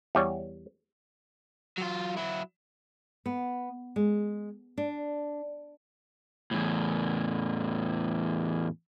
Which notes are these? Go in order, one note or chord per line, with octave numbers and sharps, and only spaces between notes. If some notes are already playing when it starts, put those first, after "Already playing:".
E2 G3 C#5
F#3 F4
F#3 E4
B3
G#3
D4
E2 A2